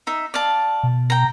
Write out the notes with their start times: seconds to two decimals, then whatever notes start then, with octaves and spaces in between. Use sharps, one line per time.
0.07 D#4 E5
0.34 D5 F5 A5
0.83 B2
1.10 G5 A#5